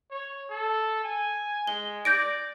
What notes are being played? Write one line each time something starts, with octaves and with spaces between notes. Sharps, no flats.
C#5
A4
G#5
G#3 G7
D5 G6 A#6 D7